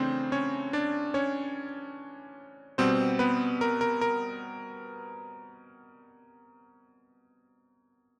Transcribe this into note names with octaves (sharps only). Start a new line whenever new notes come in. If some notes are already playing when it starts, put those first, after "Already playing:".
Already playing: C#3 E3 A3 C4 D4 C5
C#4 C#5
D4 D5
C#4 C#5
B2 G3 B3 C4 C5
B3 B4
A#4
A#4
A#4